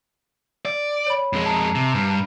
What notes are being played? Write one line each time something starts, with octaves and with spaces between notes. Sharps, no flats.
D5
C#5 B5
F2 G#3
A5 A#5
C3
G2